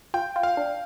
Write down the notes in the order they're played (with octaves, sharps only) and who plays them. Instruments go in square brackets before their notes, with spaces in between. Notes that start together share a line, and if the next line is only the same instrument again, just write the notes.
[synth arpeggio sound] F4 [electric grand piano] G5
[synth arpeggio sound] F4
[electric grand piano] F5
[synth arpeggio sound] D4